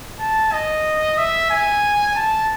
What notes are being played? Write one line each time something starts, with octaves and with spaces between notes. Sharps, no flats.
A5
D#5
E5
G#5
A5